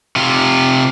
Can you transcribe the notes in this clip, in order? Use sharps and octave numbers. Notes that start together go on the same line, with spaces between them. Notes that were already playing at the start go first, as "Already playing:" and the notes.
C3 F4